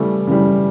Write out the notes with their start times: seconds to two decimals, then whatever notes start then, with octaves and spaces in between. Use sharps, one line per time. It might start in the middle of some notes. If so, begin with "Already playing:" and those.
Already playing: C#3 E3 G3 A3
0.27 C#3 E3 G3